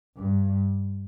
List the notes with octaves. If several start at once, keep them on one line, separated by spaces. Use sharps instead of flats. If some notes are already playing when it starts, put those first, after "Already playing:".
G2